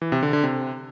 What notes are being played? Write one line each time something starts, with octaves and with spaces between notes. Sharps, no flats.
E3
C3
D3
D3
C3